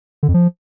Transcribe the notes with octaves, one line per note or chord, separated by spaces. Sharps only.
D3
F2
F3